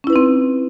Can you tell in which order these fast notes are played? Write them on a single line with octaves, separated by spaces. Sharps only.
C#4 E4 B4 D#4 C4